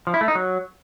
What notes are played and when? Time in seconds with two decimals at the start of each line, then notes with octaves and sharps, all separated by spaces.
0.07 F3
0.14 E4
0.21 A3
0.28 D#4
0.35 F#3